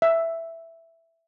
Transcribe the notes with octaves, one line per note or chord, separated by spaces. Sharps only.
E5